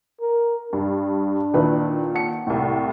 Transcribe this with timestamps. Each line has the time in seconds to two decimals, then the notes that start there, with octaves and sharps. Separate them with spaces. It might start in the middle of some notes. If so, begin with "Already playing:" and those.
0.21 A#4
0.73 G2 D4
1.54 A#2 D#3 E4 B4 E5
2.14 F#5 A5 C#7
2.47 C2 A2